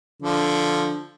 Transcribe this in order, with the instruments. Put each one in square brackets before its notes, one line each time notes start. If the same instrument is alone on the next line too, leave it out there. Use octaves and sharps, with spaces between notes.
[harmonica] D3 F3